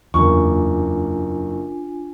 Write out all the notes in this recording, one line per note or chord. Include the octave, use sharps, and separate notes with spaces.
F#1 E2 A#3 D4 F4 G#5 C#6